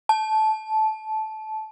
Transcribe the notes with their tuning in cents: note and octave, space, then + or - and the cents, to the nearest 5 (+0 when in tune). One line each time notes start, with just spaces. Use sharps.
A5 -15